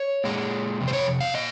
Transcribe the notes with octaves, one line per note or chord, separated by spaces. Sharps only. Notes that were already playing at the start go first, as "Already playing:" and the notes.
Already playing: C#5
A#2 G#3
F2 C3
C5
C#5
F5
A#2 D#5